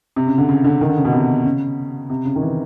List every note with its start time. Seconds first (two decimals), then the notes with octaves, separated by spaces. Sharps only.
0.16 C3
0.27 C#3
0.38 D3
0.49 C#3
0.64 D3
0.81 D#3
0.89 D3
0.97 C#3
1.05 B2
1.13 C3
1.45 C#3
2.10 C3
2.25 C#3
2.36 D#3
2.41 E3